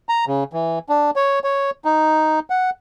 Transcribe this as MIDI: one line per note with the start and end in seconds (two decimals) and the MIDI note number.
0.09 0.25 82
0.27 0.44 49
0.53 0.79 52
0.89 1.11 62
1.16 1.39 73
1.44 1.70 73
1.85 2.39 63
2.50 2.70 78